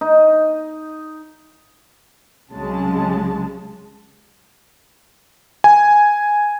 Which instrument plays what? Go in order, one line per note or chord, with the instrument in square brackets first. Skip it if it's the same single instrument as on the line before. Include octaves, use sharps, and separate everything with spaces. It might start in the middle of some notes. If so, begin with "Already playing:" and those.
[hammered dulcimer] D#4
[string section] C2 C#3 F#3 G#3 A5
[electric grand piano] G#5